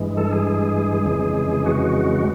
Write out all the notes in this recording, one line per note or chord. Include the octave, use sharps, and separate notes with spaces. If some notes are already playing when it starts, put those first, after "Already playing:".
Already playing: G2 E3 G#3
A4
G#4
F2 C#3 E3 G#3
F#4